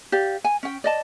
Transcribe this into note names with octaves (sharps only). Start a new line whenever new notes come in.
G4 D5 F5
G#5
C#4 G5
D5 D#5 A5